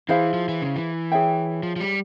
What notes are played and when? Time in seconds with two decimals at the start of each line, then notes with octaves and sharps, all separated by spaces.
0.08 E3 E4 G#4 C5 F5
0.34 F3
0.49 E3
0.62 C#3
0.76 E3
1.12 G#4 C#5 E5 G5
1.63 F3
1.76 F3
1.80 G3